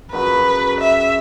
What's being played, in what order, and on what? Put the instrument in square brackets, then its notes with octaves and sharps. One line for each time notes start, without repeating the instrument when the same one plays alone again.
[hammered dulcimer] F#2 C#3 F#3 [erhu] B4
[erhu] E5